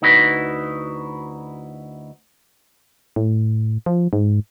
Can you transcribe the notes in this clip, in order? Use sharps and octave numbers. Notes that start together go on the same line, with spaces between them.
D2 D#4 E4 F#4 B4
A2
F3
G#2